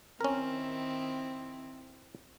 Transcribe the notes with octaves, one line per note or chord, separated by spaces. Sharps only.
D#3 C4 C#4 E4 A#4